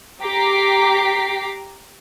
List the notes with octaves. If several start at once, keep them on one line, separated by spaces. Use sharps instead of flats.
G4 A#5 D6 B6 C7